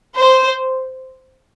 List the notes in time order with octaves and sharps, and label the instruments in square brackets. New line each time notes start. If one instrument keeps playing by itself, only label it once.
[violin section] C5